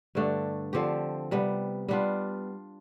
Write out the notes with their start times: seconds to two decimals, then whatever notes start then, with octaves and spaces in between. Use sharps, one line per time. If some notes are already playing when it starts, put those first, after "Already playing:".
0.15 G2 D3 A3 D4
0.73 D3 F3 C4 G4
1.31 C3 G3 B3
1.89 G3 B3 D4 F4